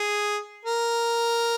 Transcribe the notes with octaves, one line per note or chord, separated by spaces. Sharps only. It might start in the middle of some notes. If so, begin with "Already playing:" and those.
Already playing: G#4
A#4